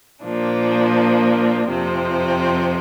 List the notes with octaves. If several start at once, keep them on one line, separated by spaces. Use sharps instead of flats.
A#2 F3 A#3 D4
F2 C3 F3 C4